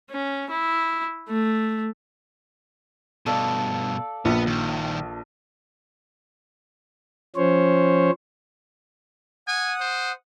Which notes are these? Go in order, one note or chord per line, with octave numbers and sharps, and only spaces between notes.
C#4
E4
A3
G2 B2 A4 D5 F5
A#1 B3
D#3 F3
F3 C#4 C5 C#5
F#5 G#5 D#6
C5